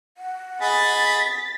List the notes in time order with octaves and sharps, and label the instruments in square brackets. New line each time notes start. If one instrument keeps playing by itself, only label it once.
[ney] F#5
[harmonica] G#4 D#5 B5 [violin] A6 B6